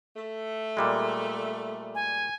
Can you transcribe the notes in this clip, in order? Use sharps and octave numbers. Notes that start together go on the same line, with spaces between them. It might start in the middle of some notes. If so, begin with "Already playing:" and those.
A3
A#2 G3 G#3
G#5